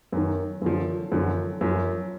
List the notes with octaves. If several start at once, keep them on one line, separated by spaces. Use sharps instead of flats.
F#2 D#3
F#2 D3 F3
F#2 D3 F3
F#2 F3